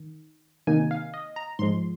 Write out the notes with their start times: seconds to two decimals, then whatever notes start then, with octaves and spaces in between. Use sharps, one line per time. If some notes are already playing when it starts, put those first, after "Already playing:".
Already playing: D#3
0.67 C3 D#3 A#3 D#4 G#5
0.91 F5
1.14 D#5
1.36 A#5
1.59 G#2 F3 G#3 C6